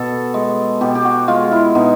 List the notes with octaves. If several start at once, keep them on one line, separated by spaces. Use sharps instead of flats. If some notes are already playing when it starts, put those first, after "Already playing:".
Already playing: B2 A4
G#3
B2 G4
G4
F#4
G#3 F4
E4
B2 D#4